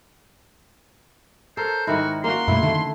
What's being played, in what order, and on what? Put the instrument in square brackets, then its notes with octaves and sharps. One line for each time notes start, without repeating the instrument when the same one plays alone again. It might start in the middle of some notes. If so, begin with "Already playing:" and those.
[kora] A4 A#4 C#5 [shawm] C5
[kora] G#2 D#3 E4 [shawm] F#4
[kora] A#3 C#4 F#4 [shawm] C6
[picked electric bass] F#2 B2 A3 [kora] E4
[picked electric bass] D3 D#3 [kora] A3